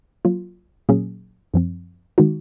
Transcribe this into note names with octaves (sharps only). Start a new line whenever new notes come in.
F#3 A#3 F4
A#2 F#3 A#3 C#4 G#4
F#2 F3 C4
D#3 G#3 D#4 F#4